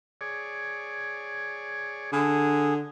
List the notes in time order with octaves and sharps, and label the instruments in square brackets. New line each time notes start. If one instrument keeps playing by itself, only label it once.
[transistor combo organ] G#4 C#5 D5
[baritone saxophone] D3 [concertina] G#4